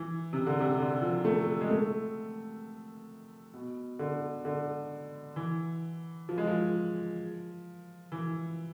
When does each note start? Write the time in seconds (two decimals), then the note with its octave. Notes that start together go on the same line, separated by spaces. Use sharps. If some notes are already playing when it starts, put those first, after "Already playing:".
Already playing: E3
0.33 C3
0.46 D3
0.60 C3
0.78 D3
1.02 F3
1.25 A3
1.61 G#3
1.70 A3
3.53 B2
3.99 D3
4.45 D3
5.36 E3
6.29 F3
6.38 G#3
6.47 F3
8.12 E3